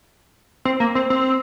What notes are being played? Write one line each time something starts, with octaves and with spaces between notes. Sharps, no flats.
C4
A#3
C4
C4